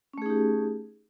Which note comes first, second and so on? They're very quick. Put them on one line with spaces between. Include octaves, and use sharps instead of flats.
C#4 A3 G#4 D#4 G4